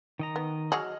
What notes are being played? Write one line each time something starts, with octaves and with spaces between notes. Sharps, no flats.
D#3 D#5 A#5
B3
F#3 F#4 G#4 D#5 F6